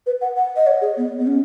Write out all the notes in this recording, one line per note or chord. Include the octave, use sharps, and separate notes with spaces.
B4
F#5
F#5
D#5
C#5
G#4
B3
B3
C#4